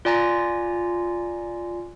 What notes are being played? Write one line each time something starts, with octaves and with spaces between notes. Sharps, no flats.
F4 D5 G#5 A#5 A#6